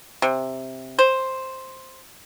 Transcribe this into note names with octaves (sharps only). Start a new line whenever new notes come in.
C3
C5